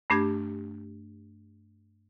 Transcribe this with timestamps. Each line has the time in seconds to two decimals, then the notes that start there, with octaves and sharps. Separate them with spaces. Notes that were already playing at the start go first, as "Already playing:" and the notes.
0.10 G2 A3 D4 G4 G#6